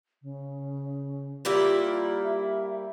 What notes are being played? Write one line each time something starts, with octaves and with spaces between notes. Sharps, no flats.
C#3
G3 A#3 E4 F4
E5